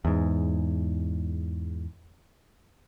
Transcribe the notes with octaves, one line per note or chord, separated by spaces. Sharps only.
E2 G#2